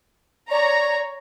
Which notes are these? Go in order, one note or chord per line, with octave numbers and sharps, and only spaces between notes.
C#5 D5 A#5